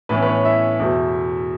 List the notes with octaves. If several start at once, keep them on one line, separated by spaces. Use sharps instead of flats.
A2 E3 A3 B3 C#4 B4
B4
C#4 C#5
E4 E5
E2 B2 A3